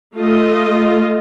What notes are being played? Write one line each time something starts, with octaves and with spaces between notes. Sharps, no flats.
A3 F4 D#5